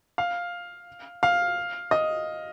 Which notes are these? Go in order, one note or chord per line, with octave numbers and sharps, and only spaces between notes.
F5
F5
D#5